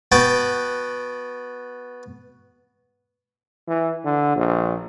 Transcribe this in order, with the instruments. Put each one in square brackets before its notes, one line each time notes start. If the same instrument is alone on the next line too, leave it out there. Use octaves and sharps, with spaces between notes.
[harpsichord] B3 F#4 G5 A5
[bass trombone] E3
D3
A#1